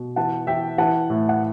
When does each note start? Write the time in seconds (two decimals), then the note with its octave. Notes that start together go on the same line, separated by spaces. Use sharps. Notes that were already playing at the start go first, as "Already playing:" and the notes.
Already playing: B2
0.16 E3 F#5 A5
0.47 E3 E5 G5
0.78 E3 F#5 A5
1.10 A2
1.29 F#5